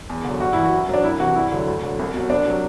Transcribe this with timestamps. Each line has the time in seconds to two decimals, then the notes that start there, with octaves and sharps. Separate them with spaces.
0.10 E2
0.24 D3 F#3
0.40 G2 F#4
0.53 E3 E4
0.64 F#4
0.73 F#2
0.89 F#3 D4
1.03 C2 E4
1.20 C3 E3 F#4
1.35 G2 E4
1.52 D3 F#3
1.67 D2
1.83 D3 F#3
1.99 C2
2.14 B2 F#3
2.30 C2 D4
2.46 C3 F#3